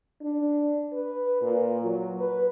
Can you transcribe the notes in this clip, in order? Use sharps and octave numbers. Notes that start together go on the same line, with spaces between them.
D4
B4
A#2
F#3
B4